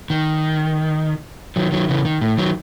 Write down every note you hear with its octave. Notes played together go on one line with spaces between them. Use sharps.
D#3
D#3 F#3
D#3 F#3
C#3 E3
D#3
A2
D#3 F#3